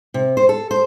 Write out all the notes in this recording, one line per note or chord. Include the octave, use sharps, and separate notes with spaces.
C3
C5
A4
C5